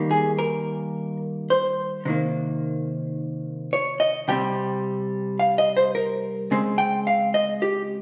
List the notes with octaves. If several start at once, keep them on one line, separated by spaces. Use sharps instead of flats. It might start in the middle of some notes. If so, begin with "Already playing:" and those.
Already playing: D#3 G3 A#3
G#4
A#4
C5
C3 D#3 A#3
C#5
D#5
C3 G3 C4 G5
F5
D#5
C5
A#4
C#3 G#3 C4
G5
F5
D#5
G4